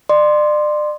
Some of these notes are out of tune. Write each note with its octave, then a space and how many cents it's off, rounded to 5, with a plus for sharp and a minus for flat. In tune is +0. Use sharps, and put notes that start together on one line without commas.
D5 +35 C6 +0